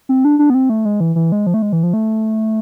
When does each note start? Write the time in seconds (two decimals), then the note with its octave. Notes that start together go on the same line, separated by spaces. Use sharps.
0.09 C4
0.25 D4
0.39 D4
0.50 B3
0.54 C4
0.69 A3
0.85 G#3
1.00 E3
1.16 E3
1.32 G#3
1.47 F3
1.54 A3
1.62 G#3
1.73 E3
1.83 F3
1.93 A3